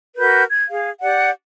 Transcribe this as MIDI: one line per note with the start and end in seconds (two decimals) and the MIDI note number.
0.17 0.43 66
0.17 0.43 70
0.17 0.43 71
0.17 0.43 91
0.50 0.65 92
0.69 0.89 68
0.69 0.89 77
1.01 1.29 67
1.01 1.29 74
1.01 1.29 78